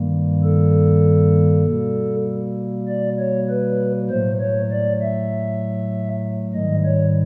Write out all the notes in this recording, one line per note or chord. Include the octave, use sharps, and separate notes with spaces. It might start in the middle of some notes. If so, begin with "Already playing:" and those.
Already playing: G2 D#3 G3 A#3
A4
B2 G3 A#3
D5
C#5
B4
A2 F#3 A3 C5
C#5
D5
E5
G#2 D#3 G3 D#5
C#5